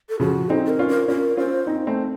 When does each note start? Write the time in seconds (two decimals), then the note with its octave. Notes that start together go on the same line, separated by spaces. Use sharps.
0.09 A4
0.20 C#3 F3 F#4
0.50 C4 D#4 A4
0.65 A4
0.69 A#4
0.79 C#4 F4
0.89 A#4
1.08 C#4 F4 A#4
1.37 C#4 F4 C5
1.67 C4 D#4
1.87 A3 C4